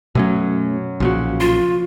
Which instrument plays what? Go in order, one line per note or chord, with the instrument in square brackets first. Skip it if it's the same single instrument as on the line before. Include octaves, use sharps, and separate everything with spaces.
[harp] F#2 F#3 [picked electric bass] B2 A3 C#4
[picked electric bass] B1 A#2 C#3 [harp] F3 F#4
[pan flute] F4 [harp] C6